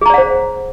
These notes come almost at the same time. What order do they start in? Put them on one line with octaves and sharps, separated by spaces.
G#4 A#5 D5 F#5 C5